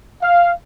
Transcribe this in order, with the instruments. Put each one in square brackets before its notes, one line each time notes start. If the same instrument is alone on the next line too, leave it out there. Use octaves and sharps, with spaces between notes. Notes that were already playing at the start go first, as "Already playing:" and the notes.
[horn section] F5